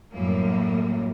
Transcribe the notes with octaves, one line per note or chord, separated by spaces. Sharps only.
F#2 A2 G3 A#3